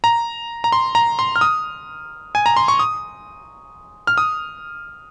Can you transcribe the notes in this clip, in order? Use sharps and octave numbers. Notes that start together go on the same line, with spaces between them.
A#5
A#5
C6
A#5
C6
F6
D#6
G#5
A#5
C6
C#6
D#6
F6
D#6